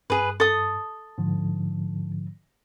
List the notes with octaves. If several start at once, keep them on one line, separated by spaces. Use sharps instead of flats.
G2 G#4 B4
A4 D#6
G#2 D3 F3